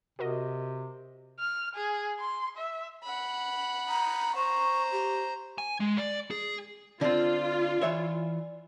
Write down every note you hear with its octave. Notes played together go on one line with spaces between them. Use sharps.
C3 F#4 A#4 D#5
F6
G#4
C6
E5
F#5 B5
A#5
C5 A#5 C#6
G4
G#5
G#3
D5
G#4
D3 C4 F4 D5
E3 C#5 E5